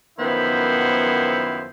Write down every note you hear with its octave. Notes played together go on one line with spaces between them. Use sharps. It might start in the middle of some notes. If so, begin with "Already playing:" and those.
F#2 D#3 F3 B3 E4 C5